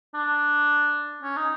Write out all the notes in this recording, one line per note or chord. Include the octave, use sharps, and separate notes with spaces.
D4
C#4
D#4